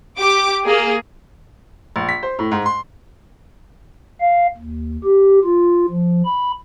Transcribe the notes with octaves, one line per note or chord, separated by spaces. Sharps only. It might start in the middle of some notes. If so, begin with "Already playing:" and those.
G4 D6
A#3 G#4
A#1
B6
C5
A2
G#2
C6
F5
D#2
G4
F4
F3
B5